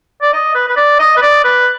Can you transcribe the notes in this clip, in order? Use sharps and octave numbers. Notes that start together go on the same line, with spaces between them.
D5
D#5
B4
B4
D5
D#5
B4
D5
B4